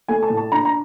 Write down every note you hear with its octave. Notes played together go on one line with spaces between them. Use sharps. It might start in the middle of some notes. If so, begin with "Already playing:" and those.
A3 G#5
A5
A2
A5
D4 A#5
A#5